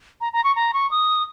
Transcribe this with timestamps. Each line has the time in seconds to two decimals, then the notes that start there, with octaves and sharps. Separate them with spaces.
0.21 A#5
0.33 A#5
0.44 C#6
0.56 A#5
0.73 C#6
0.91 D#6